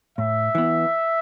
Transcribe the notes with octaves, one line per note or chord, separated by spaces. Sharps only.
A2 E5
E3 B3